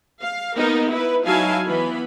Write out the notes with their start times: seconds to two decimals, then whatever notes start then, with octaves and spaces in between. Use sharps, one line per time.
0.22 F5
0.56 A#3 B3 D#4 A#4
0.90 E4 B4
1.26 F#3 D#4 E4 F5 G#5 A5
1.68 E3 B3 B5